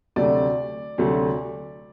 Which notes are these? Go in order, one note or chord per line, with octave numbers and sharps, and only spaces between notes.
D2 C3 F#3 A3 D5
D2 C3 F#3 A3